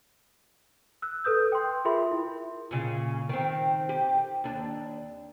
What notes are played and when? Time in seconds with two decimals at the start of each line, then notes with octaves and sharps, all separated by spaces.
1.02 E6 F#6
1.24 A4 B4 D#6 G6
1.52 G5 C6
1.85 F4 G#4 A#4 E5 B5 C6
2.12 E4
2.71 A#2 C#3
3.29 D#3 C4
3.89 G4
4.44 D#2 D4